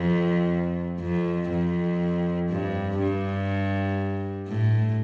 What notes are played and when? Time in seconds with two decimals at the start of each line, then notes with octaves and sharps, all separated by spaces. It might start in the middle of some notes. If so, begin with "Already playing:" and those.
Already playing: F2
1.00 F2
1.50 F2
2.49 G2
2.98 G2
4.48 A2